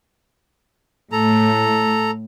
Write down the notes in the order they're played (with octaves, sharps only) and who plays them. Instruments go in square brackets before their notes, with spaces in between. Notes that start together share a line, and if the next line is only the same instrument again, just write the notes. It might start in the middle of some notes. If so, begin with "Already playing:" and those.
[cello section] A2 [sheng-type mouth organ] A4 A#5